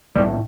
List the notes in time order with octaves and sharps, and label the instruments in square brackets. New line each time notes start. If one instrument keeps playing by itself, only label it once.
[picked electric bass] B1 A2 G3